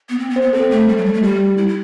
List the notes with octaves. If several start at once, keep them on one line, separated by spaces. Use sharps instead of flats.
B3
C4
B3
C5
B3
C4 A4
A3
G3
F#3
G3
A3
G3 G4
E4
E4